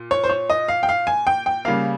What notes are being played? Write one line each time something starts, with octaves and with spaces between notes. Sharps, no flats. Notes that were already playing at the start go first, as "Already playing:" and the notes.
Already playing: A#2
C#5
C5
C#5
D#5
F5
G5
F5
G#5
G5
G5
C#3 G3 A#3 F5